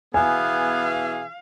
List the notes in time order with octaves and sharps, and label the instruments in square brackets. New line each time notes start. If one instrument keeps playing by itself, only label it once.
[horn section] B2 E3 G#4 [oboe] B3 [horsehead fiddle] F5 [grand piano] G#5